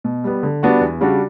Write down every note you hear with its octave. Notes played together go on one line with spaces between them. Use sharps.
B2
G3 B3
D3
G3 B3 D4 F#4
E2
C#3 G3 D4 F#4